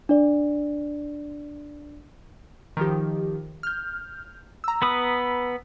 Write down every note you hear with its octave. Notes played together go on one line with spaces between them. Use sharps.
D4 D5
D#3 F3 G4
F6 G6
A#5 E6
B3 B4 D#6